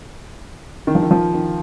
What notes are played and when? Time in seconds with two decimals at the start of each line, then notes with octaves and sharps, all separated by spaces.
0.87 D#3
0.95 F3
1.02 D#3
1.11 F3
1.34 D#3